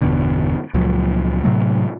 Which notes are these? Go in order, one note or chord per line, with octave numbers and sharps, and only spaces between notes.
G1 E2 B2 D3
C#2 A#2 F3 F#3
A2 C3 F#3 A3